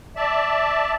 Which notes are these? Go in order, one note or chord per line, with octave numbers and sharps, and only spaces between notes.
D5 E5 A5